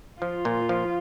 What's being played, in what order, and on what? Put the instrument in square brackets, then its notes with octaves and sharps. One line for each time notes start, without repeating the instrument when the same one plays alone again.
[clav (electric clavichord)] F3 [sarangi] F4
[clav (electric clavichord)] A#2
F3